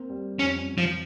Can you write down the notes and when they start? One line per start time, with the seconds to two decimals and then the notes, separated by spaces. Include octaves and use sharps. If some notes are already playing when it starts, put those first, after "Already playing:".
Already playing: A#3 C4
0.10 G3
0.39 F2 C#4
0.67 F2
0.78 F3